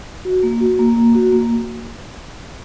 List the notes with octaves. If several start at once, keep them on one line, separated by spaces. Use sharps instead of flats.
F#4
A#3
F#4
A#3
A#3
F#4
A#3